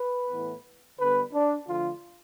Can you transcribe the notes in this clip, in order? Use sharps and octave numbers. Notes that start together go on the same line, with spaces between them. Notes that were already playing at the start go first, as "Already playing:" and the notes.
Already playing: B4
A2 E3 B3
D3 G3 B3 B4
D4
D3 F3 A3 F4